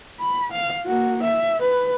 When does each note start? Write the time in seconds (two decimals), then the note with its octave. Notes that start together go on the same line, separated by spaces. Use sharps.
0.20 B5
0.52 F5
0.86 A#3 F#4
1.23 E5
1.62 B4